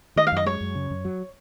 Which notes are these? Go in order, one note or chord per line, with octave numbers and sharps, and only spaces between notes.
D#3 D#5
F5
F#2 D#5
G#3 C#5
F#2
C#3
F#2
F#3